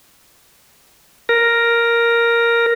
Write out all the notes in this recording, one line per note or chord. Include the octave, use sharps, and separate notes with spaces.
A#4